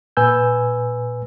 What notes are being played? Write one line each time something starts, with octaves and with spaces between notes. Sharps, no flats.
A#2 B4 G#5 E6 G6